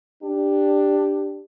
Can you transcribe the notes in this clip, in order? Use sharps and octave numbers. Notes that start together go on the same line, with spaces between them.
D4 G4